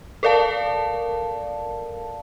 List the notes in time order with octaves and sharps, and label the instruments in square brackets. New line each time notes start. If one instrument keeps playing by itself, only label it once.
[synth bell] A4 A#4 D5 F5 A5